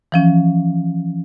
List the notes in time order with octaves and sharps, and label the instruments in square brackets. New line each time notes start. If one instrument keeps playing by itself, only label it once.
[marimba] E3 F3 C#4